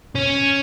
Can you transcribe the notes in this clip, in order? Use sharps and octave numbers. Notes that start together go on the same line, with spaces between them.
C#4